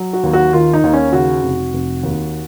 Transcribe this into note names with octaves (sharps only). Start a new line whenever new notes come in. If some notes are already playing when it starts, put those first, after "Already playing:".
Already playing: F#3
F#4
D#2
F#4
D#3 F4
D#4
D#2
C#4
C#3 F#4
F1
F1
D#2